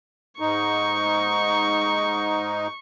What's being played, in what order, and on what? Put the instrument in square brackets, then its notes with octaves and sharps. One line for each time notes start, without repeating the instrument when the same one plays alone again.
[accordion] G#2 D#4 [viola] C#6